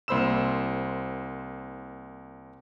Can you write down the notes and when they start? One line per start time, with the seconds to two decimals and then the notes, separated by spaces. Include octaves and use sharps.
0.08 C2 A#3 C5 B5 E6 E7